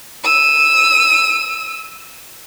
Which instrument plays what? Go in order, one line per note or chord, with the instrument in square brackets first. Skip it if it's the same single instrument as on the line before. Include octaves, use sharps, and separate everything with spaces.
[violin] E6 D#7